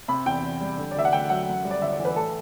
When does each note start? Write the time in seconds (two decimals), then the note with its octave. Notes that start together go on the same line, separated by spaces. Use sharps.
0.08 C3 B5
0.26 E2 G5
0.43 E2
0.61 G3
0.77 D3
0.91 D5
0.95 D2 E5
1.05 F#5
1.13 D2 G5
1.30 F#3 F#5
1.48 F#2
1.65 G3
1.71 D5
1.82 G1 E5
1.93 D5
1.99 E3
2.05 B4
2.16 A2 A4